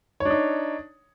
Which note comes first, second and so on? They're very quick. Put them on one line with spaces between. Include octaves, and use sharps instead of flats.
C#5 D4 D#4